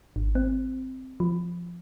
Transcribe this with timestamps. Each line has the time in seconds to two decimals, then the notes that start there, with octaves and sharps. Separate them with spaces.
0.16 G#1
0.35 C4
1.20 F3